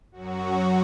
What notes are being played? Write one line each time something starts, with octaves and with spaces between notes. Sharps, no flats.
F#2 F#3 F#4